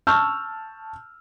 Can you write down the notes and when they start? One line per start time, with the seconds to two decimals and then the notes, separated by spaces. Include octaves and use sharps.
0.07 A5 C#6 E6 F6 G6